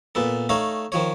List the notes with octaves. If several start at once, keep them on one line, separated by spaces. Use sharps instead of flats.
A#2 B3 A4
A3 D#4 C#5 F5
D#3 F3 C#5